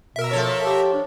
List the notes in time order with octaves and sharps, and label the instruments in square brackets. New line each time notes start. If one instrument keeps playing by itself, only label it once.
[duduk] B2 [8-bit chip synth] A#4 E5
[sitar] F3 A4 C#5
[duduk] G4
D4